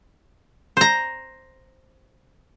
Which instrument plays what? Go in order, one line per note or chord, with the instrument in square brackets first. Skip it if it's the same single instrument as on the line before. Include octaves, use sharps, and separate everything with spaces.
[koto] C5 A#5